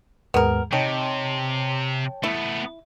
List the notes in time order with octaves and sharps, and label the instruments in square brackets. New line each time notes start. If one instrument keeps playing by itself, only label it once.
[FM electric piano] D#2 G#2 G#3 [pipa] B3 A#4
[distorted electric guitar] C3 [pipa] D#4 [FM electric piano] C#5 G5 A5
[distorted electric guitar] A3 B3 [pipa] E4